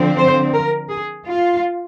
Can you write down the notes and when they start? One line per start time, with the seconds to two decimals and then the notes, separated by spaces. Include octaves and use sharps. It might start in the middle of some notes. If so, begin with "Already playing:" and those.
Already playing: D3 F3 C4
0.18 C5
0.53 A#4
0.89 G#4
1.25 F4